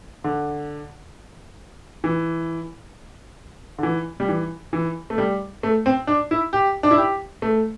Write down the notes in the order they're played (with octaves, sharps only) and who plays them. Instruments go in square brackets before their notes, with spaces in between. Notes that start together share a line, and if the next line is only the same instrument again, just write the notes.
[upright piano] D3
E3
D3
E3
G3
E3
E3
A3
G3
A3
C4
D4
E4
G4
D4
E4
G4
A3